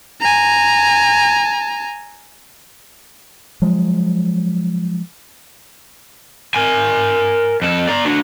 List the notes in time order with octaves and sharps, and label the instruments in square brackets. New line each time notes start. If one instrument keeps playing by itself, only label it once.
[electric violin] G#5 A#5
[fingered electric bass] F3 F#3 G#3
[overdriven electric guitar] A#4 G#5
F2 A4
D5 A#5
D4 F#4